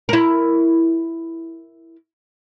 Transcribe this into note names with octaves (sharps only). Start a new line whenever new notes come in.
E4 A#4